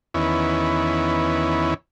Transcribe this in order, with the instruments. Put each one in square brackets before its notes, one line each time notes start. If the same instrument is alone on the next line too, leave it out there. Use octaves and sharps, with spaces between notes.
[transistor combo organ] E2 D#3 B3 C#4 E4